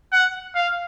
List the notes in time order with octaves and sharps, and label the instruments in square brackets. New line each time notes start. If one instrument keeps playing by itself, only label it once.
[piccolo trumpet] F#5
F5